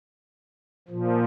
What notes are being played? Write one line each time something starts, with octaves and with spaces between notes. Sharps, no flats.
A#2 F3